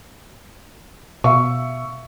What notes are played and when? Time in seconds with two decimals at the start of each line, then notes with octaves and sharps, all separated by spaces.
1.24 B2 E5 F5 C#6